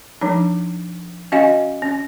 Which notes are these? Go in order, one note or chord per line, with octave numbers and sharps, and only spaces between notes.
F3 D4 D#4
C#4 F#4 D#5 F5 G#5
C#4